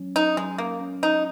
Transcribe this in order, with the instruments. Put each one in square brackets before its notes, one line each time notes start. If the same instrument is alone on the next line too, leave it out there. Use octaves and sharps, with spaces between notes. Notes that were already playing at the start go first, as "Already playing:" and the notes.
Already playing: [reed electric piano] F#3 C#4
[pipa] D#4
[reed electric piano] F#3 [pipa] G#3
[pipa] A#3
[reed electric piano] C#4
[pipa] D#4